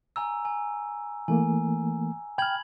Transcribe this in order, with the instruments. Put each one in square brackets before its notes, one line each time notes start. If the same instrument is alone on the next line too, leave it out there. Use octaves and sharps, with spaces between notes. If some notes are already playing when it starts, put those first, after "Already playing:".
[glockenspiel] G#5 A#5 E6
G#5
[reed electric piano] E3 A3 A#3 [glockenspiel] G#5
[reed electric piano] G5 F6 [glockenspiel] B5 G#6 F#7